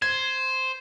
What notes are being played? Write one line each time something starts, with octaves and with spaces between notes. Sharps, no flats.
C5 G#6